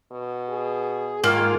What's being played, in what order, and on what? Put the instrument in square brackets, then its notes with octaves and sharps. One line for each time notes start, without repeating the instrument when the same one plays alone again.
[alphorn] B2
[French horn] G#4
[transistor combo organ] G#2 F4 [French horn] D#3 [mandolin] A#3